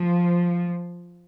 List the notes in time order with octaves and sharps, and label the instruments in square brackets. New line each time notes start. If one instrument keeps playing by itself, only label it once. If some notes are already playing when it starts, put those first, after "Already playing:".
Already playing: [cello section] F3